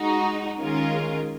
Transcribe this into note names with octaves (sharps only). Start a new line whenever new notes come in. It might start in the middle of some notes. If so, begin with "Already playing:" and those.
Already playing: G#3 D#4 F#4
D#3 G#3 C#4 F4 A#4